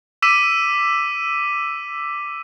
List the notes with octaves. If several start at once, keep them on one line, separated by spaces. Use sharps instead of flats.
D6 E6 B6 D#7 E7